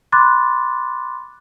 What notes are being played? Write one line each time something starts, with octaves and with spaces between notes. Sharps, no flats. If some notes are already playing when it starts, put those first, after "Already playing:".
B5 C6 D6 F#6 A6